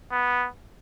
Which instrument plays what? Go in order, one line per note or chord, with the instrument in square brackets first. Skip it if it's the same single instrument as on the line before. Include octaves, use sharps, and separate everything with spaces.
[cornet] B3